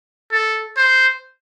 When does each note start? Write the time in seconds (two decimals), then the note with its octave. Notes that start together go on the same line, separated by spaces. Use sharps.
0.32 A4
0.77 C5